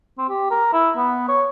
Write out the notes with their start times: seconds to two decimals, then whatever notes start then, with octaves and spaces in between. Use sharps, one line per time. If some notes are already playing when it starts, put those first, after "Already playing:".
0.18 C4
0.29 G4
0.51 A#4
0.73 E4
0.97 B3
1.29 C#5